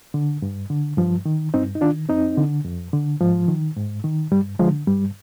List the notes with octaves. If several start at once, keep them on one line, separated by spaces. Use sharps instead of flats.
D3
G2
D3
G2 F3
D#3
G2 C4 D#4
D#4
D#3 D4 F4
F2 C4 D#4
D3
F2
D3
G#2 F3
D#3
G#2
D#3
G2 G3
D3 F3 G#3
G2 G3